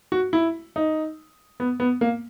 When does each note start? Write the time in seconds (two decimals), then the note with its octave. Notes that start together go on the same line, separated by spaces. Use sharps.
0.12 F#4
0.33 E4
0.76 D#4
1.60 B3
1.80 B3
2.01 A#3